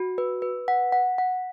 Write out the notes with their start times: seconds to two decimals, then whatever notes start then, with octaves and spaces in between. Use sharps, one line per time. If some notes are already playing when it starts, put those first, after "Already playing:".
Already playing: F#4
0.18 B4
0.42 B4
0.68 F#5
0.92 F#5
1.18 F#5